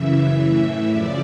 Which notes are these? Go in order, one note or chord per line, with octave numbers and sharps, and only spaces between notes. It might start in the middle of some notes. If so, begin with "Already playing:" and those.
Already playing: F#2 C#3 E3 E5
A2 E3
F#2 C#3 F3 D5